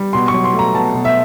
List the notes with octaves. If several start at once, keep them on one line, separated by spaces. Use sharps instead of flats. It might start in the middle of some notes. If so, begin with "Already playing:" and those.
Already playing: G3
B2 C6
C#6
F#3
C6
A3
A#5
B2 A5
B2
E5